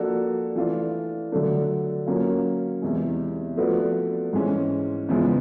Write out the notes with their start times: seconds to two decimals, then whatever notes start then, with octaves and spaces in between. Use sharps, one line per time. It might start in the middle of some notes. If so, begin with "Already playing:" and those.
Already playing: F3 A#3 D4 F#4 A4
0.56 E3 A3 D4 F4
1.32 D3 F#3 A3 D4
2.06 F#3 A#3 C#4 F4
2.82 E2 C3 E3 G#3
3.57 F3 A3 D4 F#4 B4
4.33 G#2 E3 G#3 C#4
5.09 E2 C#3 F3 G#3 B3